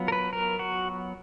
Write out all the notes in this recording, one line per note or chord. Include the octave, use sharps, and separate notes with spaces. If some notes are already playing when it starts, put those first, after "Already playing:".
Already playing: F#3 B3 F4
A#4
B4
A#4
F#4